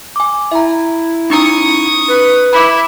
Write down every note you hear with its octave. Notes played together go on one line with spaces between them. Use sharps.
G#5 D6
E4 E5 A#5
C#4 D#4 A#5 C#6 D#6
B4
E4 B5 D6